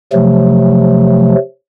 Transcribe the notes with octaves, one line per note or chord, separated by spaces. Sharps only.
C3 F3 F#3 A3